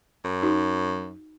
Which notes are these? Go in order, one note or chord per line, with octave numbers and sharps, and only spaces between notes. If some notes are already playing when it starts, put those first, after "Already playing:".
F#2
D#4 F#4